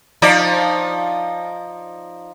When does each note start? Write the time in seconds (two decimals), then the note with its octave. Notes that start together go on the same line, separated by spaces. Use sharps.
0.22 F3 D#4 D5